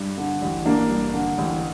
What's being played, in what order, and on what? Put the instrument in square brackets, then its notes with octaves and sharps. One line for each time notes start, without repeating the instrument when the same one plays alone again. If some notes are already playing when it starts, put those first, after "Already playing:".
Already playing: [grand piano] G2
D3
A1
[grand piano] A1 [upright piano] A#3 D4
[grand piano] G2
D3
A1